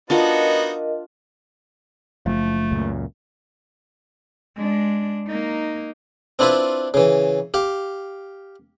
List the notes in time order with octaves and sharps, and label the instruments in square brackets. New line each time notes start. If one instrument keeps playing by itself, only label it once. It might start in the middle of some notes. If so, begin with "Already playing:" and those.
[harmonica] B3 D#4 F#4 [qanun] D4 F4 F#5 [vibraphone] A#4 D#5
[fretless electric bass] F#1 F3 [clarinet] A3
[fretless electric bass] C#2 F#2 A#2
[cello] G#3 D4
A#3 D#4
[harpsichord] C4 D4 E4 F4 B4
C#3 E3
G4 F5